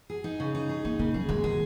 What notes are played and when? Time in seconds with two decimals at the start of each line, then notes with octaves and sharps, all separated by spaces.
0.10 G#4
0.24 D#4
0.40 C#3
0.55 D#4
0.69 G#4
0.85 A#3 D#4
0.99 C#3 A#3
1.14 F#3 G#4
1.29 D#3 G#3
1.44 D#3 G#4